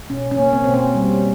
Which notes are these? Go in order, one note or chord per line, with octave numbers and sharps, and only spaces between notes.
B2 C#4
C#4
A#3
C4
B2 C4
C#4
G3